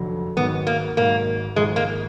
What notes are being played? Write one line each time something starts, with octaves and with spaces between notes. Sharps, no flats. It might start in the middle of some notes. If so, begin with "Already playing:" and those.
Already playing: F1 F2 D3 F#3
G#1 G#2 D#3 F#3 B3
A#3
G#1 G#2 D#3 F#3 A#3
G#1 G#2 F3 G#3
A#3